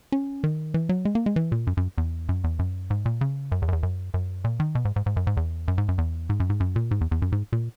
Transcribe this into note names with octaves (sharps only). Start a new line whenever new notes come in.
C#4
D#3
E3
F#3
G#3
A#3
G#3
E3
A#2
F#2
F#2
E2
F#2
E2
F#2
G#2
A#2
C#3
F#2
E2
F#2
E2
F#2
F#2
A#2
D#3
B2
G#2
G#2
G#2
F#2
G#2
E2
F#2
G#2
F#2
E2
G#2
F#2
G#2
F#2
A#2
G#2
E2
E2
F#2
G#2
A#2